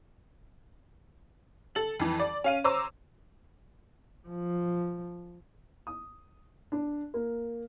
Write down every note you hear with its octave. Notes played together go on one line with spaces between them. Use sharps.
A4 F#7
F2 E3
D5
C#4 F5 D#7
C5 C#5 A#5 D6 E6
F3
D#6
D4
A#3